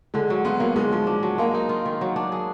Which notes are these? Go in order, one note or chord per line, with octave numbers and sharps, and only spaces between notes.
D3 G#3
F#3
B3 F4
F#3 A#3
G#2 G#3
F3
D4
F#3
G#3 A#3
D#4
F4
D#3
F#3
D4
G#4